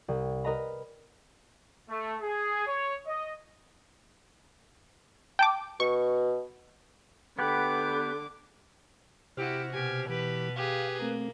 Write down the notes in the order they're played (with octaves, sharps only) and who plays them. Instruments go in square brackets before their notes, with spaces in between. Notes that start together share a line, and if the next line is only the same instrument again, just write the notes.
[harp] C2
A#4 B4 D#5 A#5 B5
[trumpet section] A3
G#4
C#5
D#5
[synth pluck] G5 A5 D6
[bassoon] B2 [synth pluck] C#6
[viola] D3 D6 [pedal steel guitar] B3 G4 B4
[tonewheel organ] C3 C5 F6 [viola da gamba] E4 F#4 [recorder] G4
[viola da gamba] B2 [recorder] G4 [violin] G#5
[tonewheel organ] E3 [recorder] G4 [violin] B4
[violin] G4 G#4 [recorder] B4 [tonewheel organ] F5
[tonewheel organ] A3 C4 [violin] A#3